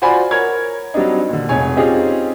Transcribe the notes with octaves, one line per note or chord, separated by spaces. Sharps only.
F4 F#4 C5 D5 G#5 B5
A#4 C#5 G#6
F#3 G3 C4 D4 D#4
A#2 D3
F1 G#3 C#5 G#5
C4 C#4 D#4 F4 G4 G#4